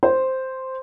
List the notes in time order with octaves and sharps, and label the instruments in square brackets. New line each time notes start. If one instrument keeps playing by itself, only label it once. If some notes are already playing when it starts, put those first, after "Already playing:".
[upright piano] C5